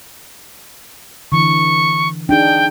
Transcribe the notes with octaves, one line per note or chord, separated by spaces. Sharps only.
D3 E3 C#6
D4 D#4 G#4 G5